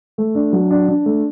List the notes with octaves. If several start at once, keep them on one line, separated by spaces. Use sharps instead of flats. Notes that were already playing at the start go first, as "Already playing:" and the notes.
A3
D4
F#3
D4
D4
A3